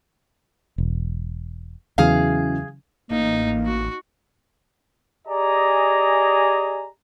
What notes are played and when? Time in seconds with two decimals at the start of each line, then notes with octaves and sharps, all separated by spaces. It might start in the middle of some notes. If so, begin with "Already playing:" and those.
0.78 E1
1.98 E2 C#3 E3 F#3 G#4 F5
3.11 A1 A#3 D#4
3.66 F#4
5.28 G4 G#4 D5 D#5 G#5 A#5